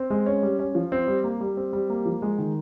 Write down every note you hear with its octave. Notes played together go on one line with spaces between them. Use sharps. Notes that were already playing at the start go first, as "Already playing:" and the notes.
Already playing: C4
G#3
C#4
G3
C#4
F3
C4
G3
A#3
G3
C4
G3
A#3
F3
G#3
D#3